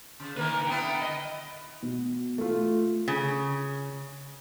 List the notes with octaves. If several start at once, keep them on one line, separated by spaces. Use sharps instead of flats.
C#3
D3 D#3 A#3 B4 A#5
D3 B3 E4 G5
D#5
B2
A3 F4
C#3